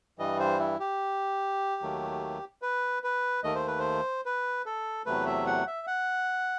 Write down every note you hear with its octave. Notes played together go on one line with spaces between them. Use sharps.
G2 E3 G3 D#5
C5
E4
G4
D#2 D#3 F#3 A3
B4
B4
D#2 D#3 A3 D#5
C5
B4
C5
B4
A4
E2 C3 F#3 A3 B4
E5
F#5
E5
F#5